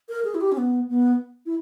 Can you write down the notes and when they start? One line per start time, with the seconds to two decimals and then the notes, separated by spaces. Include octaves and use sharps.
0.09 A#4
0.25 G#4
0.35 E4
0.41 G4
0.52 C#4
0.57 B3
0.89 B3
1.46 E4